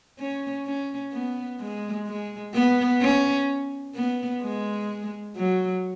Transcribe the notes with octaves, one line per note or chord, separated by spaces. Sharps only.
C#4
C#4
B3
G#3
G#3
B3
C#4
B3
G#3
F#3